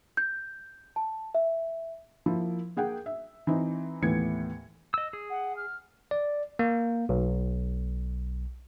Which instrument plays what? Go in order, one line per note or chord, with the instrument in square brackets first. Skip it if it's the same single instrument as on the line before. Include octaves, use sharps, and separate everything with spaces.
[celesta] G6
A5
E5
[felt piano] F3 A#3 E4
A#3 G#4 F#5 G5
E5
E3 C4 D#4
D#2 A2 E3 B3 G#6 C#7
[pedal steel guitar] D#5 E6
G#4
[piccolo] F#5
F6
[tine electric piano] D5
A#3
B1